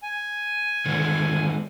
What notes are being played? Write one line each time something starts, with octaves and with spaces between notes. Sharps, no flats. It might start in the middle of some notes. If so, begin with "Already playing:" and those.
G#5
D3 D#3 G#3